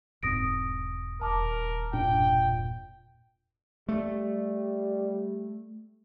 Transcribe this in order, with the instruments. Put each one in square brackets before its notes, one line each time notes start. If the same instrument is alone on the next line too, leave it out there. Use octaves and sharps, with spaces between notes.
[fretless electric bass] E1 G#2 C4 [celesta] D#6 A#6 D7
[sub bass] D#1 [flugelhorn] A#4 [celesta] A5 D6
[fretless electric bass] E1 G2 D4 [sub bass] A#2 [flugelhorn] G5
[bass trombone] G3 [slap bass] A3